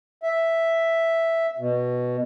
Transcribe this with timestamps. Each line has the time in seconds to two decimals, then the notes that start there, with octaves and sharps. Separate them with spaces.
0.23 E5
1.59 B2